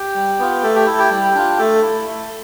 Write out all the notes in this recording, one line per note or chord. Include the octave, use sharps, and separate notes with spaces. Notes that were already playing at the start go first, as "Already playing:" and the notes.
Already playing: G4
G3
B3 F4
A3 A4
G4
E4 A4
G4
G3
D4 F4
A3 A4
E4
A3